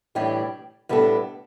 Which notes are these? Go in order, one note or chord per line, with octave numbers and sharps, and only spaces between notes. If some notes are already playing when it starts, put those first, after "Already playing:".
A2 E3 G3 D4 G4
A2 G3 B3 D4 A4